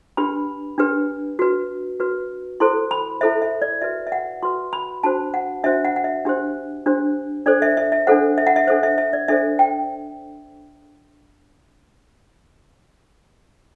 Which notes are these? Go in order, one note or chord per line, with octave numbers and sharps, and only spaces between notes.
D4 G4 B4 B5
D4 G4 B4
F#4 B4
F#4 B4
E4 A4 C5 C6
B5
E4 A4 C5 E5
E5
D5
F#4 B4 E5
E5
F#5
F#4 B4 C6
B5
D4 F#4 C5 A5
F#5
D4 F#4 C5 E5
F#5
F#5
E5
D4 G4 C5
D4 G4 C5
D4 A4 C5 D5
E5
E5
E5
D4 A4 C5 F#5
E5
F#5
E5
D4 A4 C5 E5
E5
E5
D5
D4 A4 C5 E5
G5